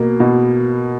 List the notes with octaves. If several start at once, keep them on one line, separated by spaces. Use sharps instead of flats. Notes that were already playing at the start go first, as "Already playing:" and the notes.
Already playing: B2 A#3
B2